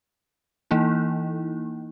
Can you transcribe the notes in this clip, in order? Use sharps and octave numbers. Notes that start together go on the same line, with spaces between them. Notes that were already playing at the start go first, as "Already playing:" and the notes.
E3 A#3 D#4 E4